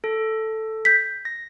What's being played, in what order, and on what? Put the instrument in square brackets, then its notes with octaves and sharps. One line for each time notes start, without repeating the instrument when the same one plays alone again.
[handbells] A4
[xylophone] G6 B6
[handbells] A#6